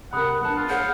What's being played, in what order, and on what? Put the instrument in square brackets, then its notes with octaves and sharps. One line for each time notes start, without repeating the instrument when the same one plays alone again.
[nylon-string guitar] C3 A#4 [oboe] F#5 [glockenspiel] B5 D#6 F#6
[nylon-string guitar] B3 D4 A5 [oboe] F#5
[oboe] F4
[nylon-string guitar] G#4 C#5 [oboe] F5 [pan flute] F#5 [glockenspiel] G6